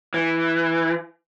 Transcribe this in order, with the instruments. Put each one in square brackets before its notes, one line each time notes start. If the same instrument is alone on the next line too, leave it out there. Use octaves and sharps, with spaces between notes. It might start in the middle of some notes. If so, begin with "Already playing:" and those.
[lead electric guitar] E3